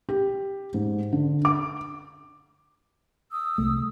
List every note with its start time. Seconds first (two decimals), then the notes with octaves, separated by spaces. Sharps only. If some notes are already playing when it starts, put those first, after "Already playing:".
0.09 G4
0.74 G#2
1.12 D3
1.45 D6
3.31 D#6 E6
3.58 C2 A3